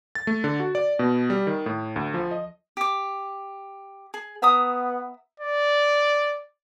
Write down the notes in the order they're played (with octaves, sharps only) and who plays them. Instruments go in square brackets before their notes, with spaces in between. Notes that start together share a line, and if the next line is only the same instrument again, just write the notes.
[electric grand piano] A6
A3
D3
F#4
D5
B2
G3
D#3
A2
D2
F3
D#5
[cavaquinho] G4 D6
G#4
[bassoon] B3 [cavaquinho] E5 A#5 D#6
[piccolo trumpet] D5